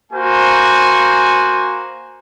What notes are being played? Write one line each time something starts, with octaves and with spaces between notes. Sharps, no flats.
A#3 F#4 C5 G#5